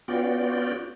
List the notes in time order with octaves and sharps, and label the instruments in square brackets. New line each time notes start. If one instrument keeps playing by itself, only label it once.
[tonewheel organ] B3 C#4 F4 F#4 D5 G5